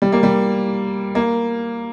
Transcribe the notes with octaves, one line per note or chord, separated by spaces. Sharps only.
G3
A#3
G3
A#3